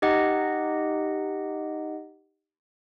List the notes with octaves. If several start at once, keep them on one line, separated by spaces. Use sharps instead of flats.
D#4 G4 D#5 F#5